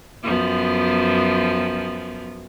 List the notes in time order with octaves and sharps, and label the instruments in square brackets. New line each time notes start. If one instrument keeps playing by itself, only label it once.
[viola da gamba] F#2 F3 B3